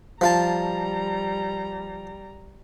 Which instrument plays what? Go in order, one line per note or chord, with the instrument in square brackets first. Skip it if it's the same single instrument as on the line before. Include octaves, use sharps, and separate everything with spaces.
[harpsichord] F3 F4 A5 [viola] G3 A#5